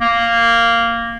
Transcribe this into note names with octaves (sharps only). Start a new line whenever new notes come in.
A#3